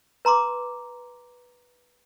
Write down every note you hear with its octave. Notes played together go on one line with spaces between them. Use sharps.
B4 A#5 C6 D6